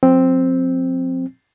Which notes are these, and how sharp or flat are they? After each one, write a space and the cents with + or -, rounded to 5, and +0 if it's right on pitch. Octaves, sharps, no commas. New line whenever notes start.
F3 +40 C4 +0